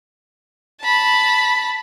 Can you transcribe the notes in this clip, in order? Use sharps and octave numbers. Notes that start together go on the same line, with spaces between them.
A5 B5